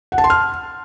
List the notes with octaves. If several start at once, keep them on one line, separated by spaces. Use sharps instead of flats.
F#5
A5
C6
F6